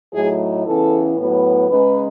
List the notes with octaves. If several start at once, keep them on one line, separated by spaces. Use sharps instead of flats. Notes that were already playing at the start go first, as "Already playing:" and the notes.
A2 F#3 A3 D#4 G#4
C#3 E3 B3 A4
A2 F#3 B3
C#3 G#3 D#4 B4